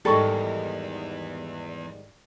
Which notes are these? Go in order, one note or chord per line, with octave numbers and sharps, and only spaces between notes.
E2 G#2 D#3 G3 A4 G5 B5 C#6